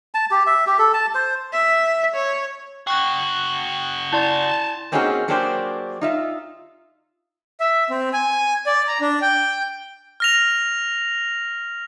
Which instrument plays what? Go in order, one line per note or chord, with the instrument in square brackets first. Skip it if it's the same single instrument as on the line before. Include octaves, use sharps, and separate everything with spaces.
[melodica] A5
G4
E5
G4
A4
A5
C5
[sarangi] E5
C#5
[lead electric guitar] C#3 F#4 [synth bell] G5 C#6 F#6
[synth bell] E4 D5 C6 [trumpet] A5
[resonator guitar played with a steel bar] A#3 C4 C#4 D#4 F#4 G#4
F#3 A#3 D4 G4 G#4 C5
D#4 F4 E5
[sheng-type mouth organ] E5
C4
G#5
D5
A#5
D4
G5
[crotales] F6 A#6 F7